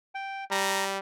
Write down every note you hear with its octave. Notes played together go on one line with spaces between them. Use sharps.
G5
G3 A#5